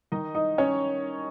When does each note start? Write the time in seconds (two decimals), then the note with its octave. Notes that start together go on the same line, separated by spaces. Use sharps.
0.12 D#3 D#4 D#5
0.35 D#4 D#5
0.58 C#4 C#5